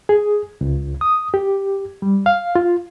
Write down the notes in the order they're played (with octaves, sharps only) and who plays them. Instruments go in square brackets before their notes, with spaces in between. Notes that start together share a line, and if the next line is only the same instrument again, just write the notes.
[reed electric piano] G#4
C#2
D#6
G4
G3
F5
F4